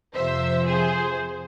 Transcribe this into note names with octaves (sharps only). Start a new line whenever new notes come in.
F2 C3 F3 C5 E5
G#4 C5